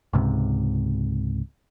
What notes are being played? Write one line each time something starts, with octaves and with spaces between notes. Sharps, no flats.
C#2 G#2 C3